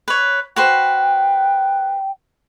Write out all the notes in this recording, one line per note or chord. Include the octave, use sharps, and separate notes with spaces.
B4 C#5
F#4 B4 C5 G5